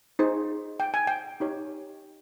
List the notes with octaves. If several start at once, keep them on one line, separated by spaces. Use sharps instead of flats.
D#4 G#4 C5
G5
G#5
G5
D#4 G4 C#5